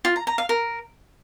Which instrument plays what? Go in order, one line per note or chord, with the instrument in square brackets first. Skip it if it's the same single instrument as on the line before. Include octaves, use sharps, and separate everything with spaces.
[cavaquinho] F4
A#5
A#5
F5
A#4